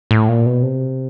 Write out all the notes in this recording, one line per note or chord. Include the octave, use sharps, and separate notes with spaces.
A2
A#2
B2
C3